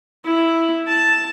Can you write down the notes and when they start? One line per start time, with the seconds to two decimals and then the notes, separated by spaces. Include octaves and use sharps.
0.25 E4
0.87 A5